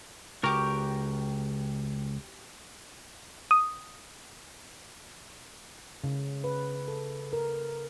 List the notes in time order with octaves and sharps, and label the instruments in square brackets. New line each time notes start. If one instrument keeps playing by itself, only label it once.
[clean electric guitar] C#2 A#4 [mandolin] F#4 G4
[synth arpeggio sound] D#6
[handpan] C#3
B4
A4
A#4